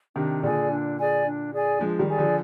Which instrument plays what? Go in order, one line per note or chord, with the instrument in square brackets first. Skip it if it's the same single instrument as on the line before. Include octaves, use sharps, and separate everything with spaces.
[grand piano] C3 D#3 [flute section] D4
[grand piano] A#2 D3 [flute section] G#4 D5 G#5
[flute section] D4
G#4 D5 G#5
D4
G#4 D5 G#5
[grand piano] F3 G#3 [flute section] D4
[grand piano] D#3 G3
[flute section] G#4 D5 G#5
[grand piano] D3 F3